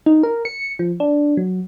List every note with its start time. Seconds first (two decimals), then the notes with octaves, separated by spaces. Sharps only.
0.06 D#4
0.23 A#4
0.45 C#7
0.79 F3
1.00 D4
1.37 F#3